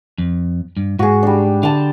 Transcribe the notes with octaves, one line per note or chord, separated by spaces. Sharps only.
F2
G2
G#2 F#4 G#4
G3 D4
D3 G5 A5